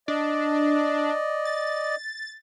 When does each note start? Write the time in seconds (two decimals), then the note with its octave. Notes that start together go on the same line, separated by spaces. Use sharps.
0.08 D4 D5 D#5
1.45 A6